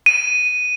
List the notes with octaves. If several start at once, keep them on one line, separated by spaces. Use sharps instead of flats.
D#7